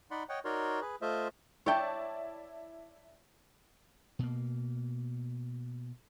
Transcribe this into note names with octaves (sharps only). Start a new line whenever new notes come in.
D#4 D5 F#5 B5 C6
C#5 D#5 F#5 G5
D#4 F#4 A#4 C#5 D5 C6
G#4 B4
A3 F4 C5 D#5 E5
E4 C#5 D5 G5 A5
B2 A#3